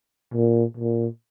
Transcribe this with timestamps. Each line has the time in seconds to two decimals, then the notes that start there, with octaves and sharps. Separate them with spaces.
0.34 A#2
0.77 A#2